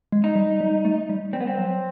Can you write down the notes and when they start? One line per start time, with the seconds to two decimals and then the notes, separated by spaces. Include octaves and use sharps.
0.12 G#3
0.24 D#4
0.36 G3
0.60 G3
0.85 A3
1.09 G3
1.33 G3 C4
1.41 B3
1.47 C4
1.58 F#3